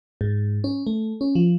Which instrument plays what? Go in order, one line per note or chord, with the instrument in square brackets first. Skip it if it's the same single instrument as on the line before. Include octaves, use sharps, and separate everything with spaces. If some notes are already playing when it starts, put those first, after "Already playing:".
[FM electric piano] G#2
C#4
A3
C#4
F3